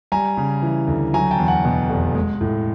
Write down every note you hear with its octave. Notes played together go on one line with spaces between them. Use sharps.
G3 G#5 A#5
C#3
E3
D2
F#3 G#5 A#5
G5 A5
E2
F#5 G#5
B2
F1
G#3
A2